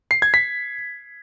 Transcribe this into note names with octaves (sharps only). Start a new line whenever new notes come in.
C7
G#6
B6